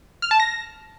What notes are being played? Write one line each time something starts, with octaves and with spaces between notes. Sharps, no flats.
F6
A5
A#6